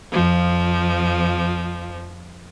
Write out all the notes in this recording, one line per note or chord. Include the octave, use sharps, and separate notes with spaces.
F2 F3